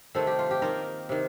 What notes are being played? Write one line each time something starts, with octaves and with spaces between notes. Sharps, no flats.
C3 D#3 A3 C4 A4
G4
F4
G4
D#3 A#3 F4 A#4
C3 D#3